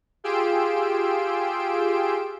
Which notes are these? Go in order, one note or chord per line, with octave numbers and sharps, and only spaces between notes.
F4 G4 G#4 C6 E6 D7